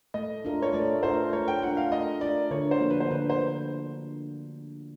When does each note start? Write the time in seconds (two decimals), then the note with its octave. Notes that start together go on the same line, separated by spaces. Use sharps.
0.14 A3 D#5
0.45 D4 F4 A#4
0.62 C#5
0.74 A3 D5
1.03 D4 F4 A#4 C5
1.33 A3 C#5
1.48 G5
1.62 D4 F4 A#4 F#5
1.77 F5
1.92 A3 D#5
2.21 D4 F4 A#4 D5
2.51 D3 C#5
2.71 C5
2.81 F3 A#3 D4 F#4
2.90 B4
3.00 C5
3.11 D3 B4
3.30 C5